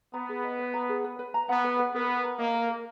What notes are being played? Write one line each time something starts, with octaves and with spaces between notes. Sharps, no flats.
B3 A#5
G#4
D#5
B4
A#5
G#4
B4
B4
A#5
B3 F#5
B4
B4
B3 A#4
A#4
A#5
A#3 D#5
A#4
A#4